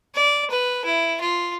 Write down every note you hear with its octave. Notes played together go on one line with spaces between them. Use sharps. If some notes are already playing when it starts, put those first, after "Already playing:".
D5
B4
E4
F4